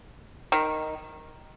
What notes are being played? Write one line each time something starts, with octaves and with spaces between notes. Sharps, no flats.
D#3